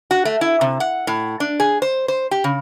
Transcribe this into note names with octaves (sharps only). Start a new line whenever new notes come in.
F#4
A3
E4
C3
F#5
A2
D4
G#4
C5
C5
G4
C#3